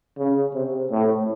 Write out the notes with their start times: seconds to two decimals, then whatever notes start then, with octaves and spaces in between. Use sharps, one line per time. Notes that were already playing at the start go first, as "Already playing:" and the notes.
0.18 C#3
0.54 C3
0.91 A2